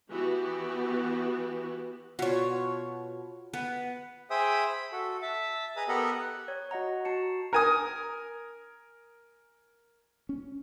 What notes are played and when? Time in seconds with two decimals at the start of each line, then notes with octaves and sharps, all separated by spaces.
0.12 E3 B3 F#4 G4
2.19 B2 F4 F#4 C#5
3.54 B3 B4
4.30 G#4 C5 E5 G5 D#6
4.68 B5
4.92 F#4 A4
5.22 E5 A5
5.76 G#4 B4 D#5 A#5 D#6
5.88 B3 G4 A4 A#4 D#5 F#5
6.20 F#6
6.48 C#5
6.71 F#4 D#5 F#5 A#5
7.05 F#4 A5 C#7
7.53 A#4 G#5 D#6
10.29 C#4